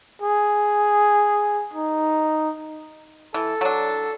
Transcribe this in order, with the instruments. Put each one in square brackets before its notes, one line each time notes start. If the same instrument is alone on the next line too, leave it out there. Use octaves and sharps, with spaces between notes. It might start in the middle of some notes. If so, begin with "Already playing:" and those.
[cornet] G#4
D#4
[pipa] E3 [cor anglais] A4
[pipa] F#3 D4